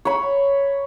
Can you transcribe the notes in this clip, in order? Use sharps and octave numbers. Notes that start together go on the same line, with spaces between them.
C#5 B5